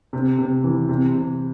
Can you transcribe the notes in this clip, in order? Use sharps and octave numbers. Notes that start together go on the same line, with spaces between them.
C3
C3
E3
C3
C3